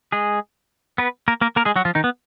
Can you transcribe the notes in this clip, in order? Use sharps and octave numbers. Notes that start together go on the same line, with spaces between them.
G#3 G#4
B3 B4
A#3 A#4
A#3 A#4
A#3 A#4
G#3 G#4
F#3 F#4
F3 F4
D#3 D#4
B3